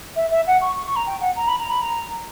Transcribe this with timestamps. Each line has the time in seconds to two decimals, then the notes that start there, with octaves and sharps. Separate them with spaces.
0.16 E5
0.31 E5
0.47 F#5
0.61 C#6
0.76 C#6
0.86 C#6
0.96 A#5
1.07 G5
1.21 F#5
1.36 A#5
1.48 B5
1.59 A#5
1.70 B5
1.82 A#5